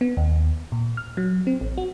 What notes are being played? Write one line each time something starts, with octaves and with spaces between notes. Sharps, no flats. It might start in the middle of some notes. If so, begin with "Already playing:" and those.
B3
D#2
A#2
F6
F#3
C4
A1
F#4